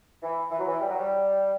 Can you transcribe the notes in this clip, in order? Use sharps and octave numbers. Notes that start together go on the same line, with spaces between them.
E3
E3
F#3
E3
G3
F#3
G3